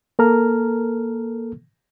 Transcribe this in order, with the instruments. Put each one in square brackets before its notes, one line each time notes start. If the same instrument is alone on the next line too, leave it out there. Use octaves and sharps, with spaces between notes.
[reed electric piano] A#3 A4 A#4 A#5 F6